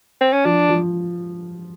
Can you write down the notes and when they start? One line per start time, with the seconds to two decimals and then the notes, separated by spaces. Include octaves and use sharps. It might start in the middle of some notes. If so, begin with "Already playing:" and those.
0.21 C4
0.33 C#4
0.45 F3 D4
0.69 F3